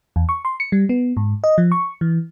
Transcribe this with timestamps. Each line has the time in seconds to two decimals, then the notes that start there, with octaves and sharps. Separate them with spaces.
0.16 E2
0.29 C#6
0.45 C6
0.60 C#7
0.72 G3
0.89 B3
1.17 G#2
1.44 D#5
1.58 F3
1.72 C#6
2.01 E3